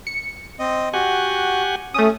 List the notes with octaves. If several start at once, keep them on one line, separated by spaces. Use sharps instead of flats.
C#7
C4 D#5
F#4 G4 F#5 G#5
A3 C#4 D#6